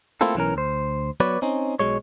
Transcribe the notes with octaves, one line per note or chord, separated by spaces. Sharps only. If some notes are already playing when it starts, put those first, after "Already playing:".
A3 A#3 C4 E4 F4 A4
B1 E3 C#4 A#4
D2 C5
F#3 B3 B4 C#5 D5
C4 C#4 D#4
B1 F#3 G#3 C#5